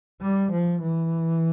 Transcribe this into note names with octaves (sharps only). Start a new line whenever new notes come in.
G3
F3
E3